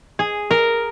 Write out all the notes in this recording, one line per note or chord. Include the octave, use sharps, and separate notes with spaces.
G#4
A#4